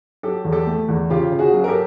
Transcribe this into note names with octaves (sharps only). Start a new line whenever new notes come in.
F#3 G4 A4
E2
G4 A4
A3
E2
C#3 F4 G4
C#3
F#4 G#4
F#3
A#4
G4 A4